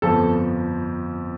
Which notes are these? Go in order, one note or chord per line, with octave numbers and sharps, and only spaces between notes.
G1 F2 F3 A4